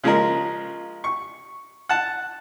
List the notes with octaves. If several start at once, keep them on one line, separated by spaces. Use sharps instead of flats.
C#3 F3 G#3 A#4
C#6
F#5 A5